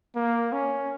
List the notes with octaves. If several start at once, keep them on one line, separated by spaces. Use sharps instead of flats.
A#3
C#4